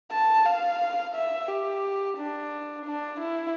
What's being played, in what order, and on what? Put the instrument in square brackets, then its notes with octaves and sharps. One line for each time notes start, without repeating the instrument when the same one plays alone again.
[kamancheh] A5
F5
E5
G4
D4
D4
E4